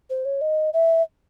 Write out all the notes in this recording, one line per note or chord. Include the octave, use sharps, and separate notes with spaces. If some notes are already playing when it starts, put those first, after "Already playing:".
C5
C#5
D#5
E5